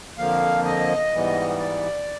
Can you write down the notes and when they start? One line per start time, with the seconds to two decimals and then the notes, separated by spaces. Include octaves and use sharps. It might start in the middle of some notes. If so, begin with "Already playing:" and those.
0.18 F2 D3 F3 A#3 F5
0.65 D#5
1.12 G#2 E3 G3 B3
1.59 D5